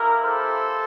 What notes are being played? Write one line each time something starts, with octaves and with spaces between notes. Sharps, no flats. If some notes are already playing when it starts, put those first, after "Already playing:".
Already playing: A#3 E4 G4 A#4
A4 C5